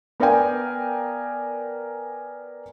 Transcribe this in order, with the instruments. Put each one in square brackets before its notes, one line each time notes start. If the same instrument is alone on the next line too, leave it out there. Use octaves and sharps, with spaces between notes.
[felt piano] B3 A#4 D5 F5 G5 G#5